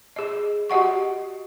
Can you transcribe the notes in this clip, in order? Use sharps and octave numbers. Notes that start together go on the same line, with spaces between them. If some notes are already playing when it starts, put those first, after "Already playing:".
G#4 D#5
F#4 G4 D#5 F#5 C#6